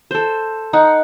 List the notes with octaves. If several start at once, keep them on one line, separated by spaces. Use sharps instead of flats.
A4 C5
D#4 F#5